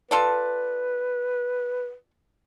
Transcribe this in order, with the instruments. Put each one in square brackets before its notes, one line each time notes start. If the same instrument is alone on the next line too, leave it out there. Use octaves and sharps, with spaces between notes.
[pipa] F4 A4 D5 [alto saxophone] B4